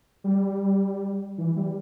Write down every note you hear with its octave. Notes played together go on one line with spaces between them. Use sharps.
G3
E3
G3